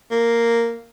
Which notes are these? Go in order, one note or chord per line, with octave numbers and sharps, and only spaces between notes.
A#3